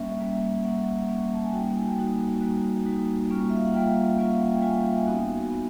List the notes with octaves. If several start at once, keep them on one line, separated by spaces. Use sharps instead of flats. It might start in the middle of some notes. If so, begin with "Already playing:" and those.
Already playing: G3 A#3 C#4 E5
G3 A#3 C#4
G3 A#3 C#4 F#5
G3 A#3 C#4
A5
G#5
G3 A#3 D#4 F#4 G5
G#5
G5
G3 A#3 D#4 F#4
G3 A#3 D#4 F#4
G3 A#3 D#4 F#4
G3 A#3 C#4 F4
E5
F5
F#5
G3 A#3 C#4 F4 G5
G3 A#3 C#4 F4
F5
F#5
G5
G3 A#3 C#4 F4 G#5
G5
E5
G#5
B3 D#4 F#4 G#5
B3 D#4